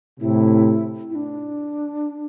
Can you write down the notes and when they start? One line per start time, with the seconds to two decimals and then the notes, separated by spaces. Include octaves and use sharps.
0.20 A2 C3 E4
1.10 E4
1.15 D4